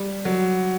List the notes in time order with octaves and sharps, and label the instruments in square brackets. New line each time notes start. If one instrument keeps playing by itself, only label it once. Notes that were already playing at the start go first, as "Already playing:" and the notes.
Already playing: [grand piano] G3
F#3